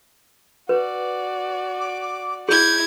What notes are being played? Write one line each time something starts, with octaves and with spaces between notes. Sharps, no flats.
F#4 B4 D5
D6
E4 G#4 G6 G#6